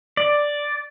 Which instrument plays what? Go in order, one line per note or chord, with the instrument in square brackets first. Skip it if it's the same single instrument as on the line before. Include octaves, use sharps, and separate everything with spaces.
[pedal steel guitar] D5